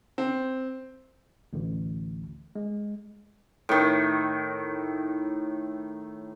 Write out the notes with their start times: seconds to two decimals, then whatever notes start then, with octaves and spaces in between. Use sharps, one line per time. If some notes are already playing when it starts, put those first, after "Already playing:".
0.18 C4
1.53 A1 D2
2.55 G#3
3.69 A2 D#3